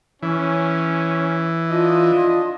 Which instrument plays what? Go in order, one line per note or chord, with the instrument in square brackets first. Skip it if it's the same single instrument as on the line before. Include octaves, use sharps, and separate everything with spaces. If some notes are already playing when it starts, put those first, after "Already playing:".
[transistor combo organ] E3 [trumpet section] C#4
[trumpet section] D4 D#5 [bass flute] F4